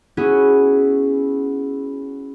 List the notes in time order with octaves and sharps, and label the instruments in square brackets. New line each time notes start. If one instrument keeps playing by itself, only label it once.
[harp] B3 C#4 E4 F#4 G#4